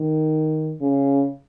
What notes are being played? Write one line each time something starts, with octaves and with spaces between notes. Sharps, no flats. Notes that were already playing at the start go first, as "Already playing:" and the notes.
Already playing: D#3
C#3